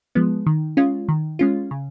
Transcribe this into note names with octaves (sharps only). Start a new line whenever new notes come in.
F3 G#3 B3
D#3
G#3 C#4 F4
D#3
G#3 C#4 F4
C#3